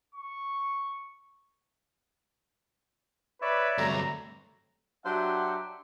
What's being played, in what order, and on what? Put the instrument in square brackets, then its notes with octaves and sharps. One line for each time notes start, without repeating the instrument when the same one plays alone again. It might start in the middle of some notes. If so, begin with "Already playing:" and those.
[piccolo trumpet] C#6
[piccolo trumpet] B4 [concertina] C#5 D5 E5
[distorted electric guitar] D2 G2 [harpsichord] C3 F#3 A3 [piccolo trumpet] A#5
[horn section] F#3 D4 G4 C5 E5 F#5